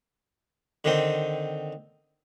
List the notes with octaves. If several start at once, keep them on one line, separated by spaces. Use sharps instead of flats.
D3 D#3 C4